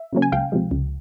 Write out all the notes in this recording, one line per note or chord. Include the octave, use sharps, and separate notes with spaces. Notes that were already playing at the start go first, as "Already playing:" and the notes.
Already playing: E5
C#3 F#3 A#3 C#4
G#5
C#2 F5 G5
C3 F3 G#3
C#2